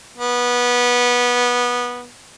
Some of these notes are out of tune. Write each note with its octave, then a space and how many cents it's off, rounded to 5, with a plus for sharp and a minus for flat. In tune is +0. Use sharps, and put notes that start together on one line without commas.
B3 -15